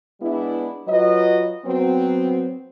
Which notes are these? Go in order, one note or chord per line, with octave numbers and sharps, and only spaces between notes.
G#3 B3 D4 E4
F#3 F4 B4 D#5
F#3 B3 C4